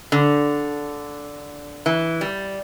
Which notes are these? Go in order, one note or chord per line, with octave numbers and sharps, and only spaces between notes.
D3
E3
G3